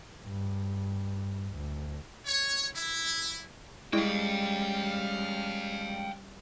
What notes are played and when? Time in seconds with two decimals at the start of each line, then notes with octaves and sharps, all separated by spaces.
0.23 G2
1.56 D2
2.26 C#5
2.76 E4
3.93 G3 G#3 C#4 E4 F5 G5